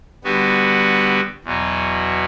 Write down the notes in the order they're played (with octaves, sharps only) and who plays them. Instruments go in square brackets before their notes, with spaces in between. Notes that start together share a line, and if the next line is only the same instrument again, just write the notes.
[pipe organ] D3 G3 B3 F#4
E2 B2 F#3